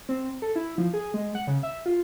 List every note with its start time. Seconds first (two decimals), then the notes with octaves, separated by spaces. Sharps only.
0.09 C4
0.42 A4
0.56 E4
0.78 F3
0.94 G#4
1.14 G#3
1.35 F#5
1.47 C#3
1.63 E5
1.86 F4